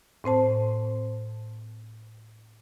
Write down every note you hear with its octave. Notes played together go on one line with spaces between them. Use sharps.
A2 C4 C5 A5